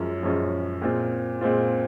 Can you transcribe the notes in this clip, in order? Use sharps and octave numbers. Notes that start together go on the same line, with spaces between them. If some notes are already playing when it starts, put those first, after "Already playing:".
Already playing: F#2 F3 G#3 C#4 F4
F#2 F3 G#3 C#4 F4
A#2 G#3 C4 F4
A#2 G#3 C4 F4